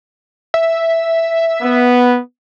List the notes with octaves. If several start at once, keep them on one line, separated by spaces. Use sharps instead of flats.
E5
B3